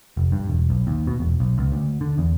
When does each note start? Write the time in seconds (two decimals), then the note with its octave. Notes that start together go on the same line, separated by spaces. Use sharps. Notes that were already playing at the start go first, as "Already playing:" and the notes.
0.17 F1
0.32 G2
0.47 E1
0.70 B1
0.87 D#2
1.07 B2
1.20 E1
1.40 B1
1.58 C#2
1.72 D2
2.01 D3
2.18 E2